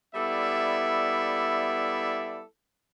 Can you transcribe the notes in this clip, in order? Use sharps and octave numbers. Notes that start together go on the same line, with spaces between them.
G3 B3 E4 A4 D5 E5